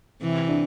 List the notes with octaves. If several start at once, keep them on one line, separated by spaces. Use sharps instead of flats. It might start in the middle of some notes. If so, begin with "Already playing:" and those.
C3 E3
D4